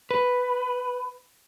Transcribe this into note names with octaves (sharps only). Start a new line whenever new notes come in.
B4